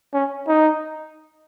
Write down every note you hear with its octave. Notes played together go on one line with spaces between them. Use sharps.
C#4
D#4